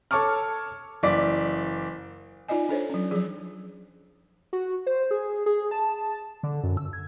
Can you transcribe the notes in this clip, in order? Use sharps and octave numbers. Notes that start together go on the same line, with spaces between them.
A4 C#5 A5 C#6 D6 F6
F#1 E3 D5 D6 B6
D#4 F4 D5 D#5 G#5
D4 A4 C5 C#5
F#3 C#4
F3 F#3 G#4
F#4
C5
G#4
G#4
A5
D3
F#2
E6
G#6